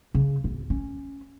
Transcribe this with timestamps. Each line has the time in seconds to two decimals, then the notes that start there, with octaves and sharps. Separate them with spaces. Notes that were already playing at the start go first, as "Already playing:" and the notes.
0.14 C#3
0.44 D1
0.70 C#4